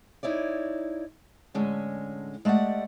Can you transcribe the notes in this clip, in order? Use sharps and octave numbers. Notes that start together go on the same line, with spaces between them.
D#4 E4 C#5 D5
A2 D3 G#3 C#4
G#3 A3 G4 D5 F#5